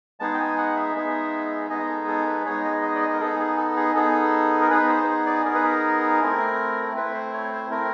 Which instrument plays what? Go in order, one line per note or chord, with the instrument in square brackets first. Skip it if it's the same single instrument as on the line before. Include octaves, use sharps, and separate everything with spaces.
[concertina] G#3 B3 D#4 G#4 A5
G5
G#5
F#5
E5
G#3 B3 D#4 G#4
G#3 B3 D#4 G#4 D#5
A4
A4
B4
G#3 B3 D#4 G#4 C#5
D#5
D#5
D5
D#5
A#4
B3 D#4 G#4 A4
G#4
A4
G#4
B3 D#4 G#4 A4
A#4
B3 D#4 G#4 B4
C5
D5
B3 D#4 G#4 A#4
B4
A#4
A3 C4 E4
A3 C4 E4 B4
C5
C#5
C5
A3 C4 E4 A#4